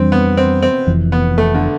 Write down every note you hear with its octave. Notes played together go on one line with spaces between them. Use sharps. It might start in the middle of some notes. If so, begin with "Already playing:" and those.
Already playing: F2 E3 G3 C4 D4
B3
C4
C4
F1 F2 E3
B3
A3
D3